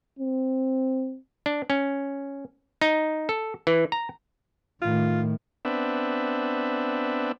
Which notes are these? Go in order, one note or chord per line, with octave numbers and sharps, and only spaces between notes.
C4
D4
C#4
D#4
A4
E3
A#5
A2 D#3 F4
B3 C4 D4 E5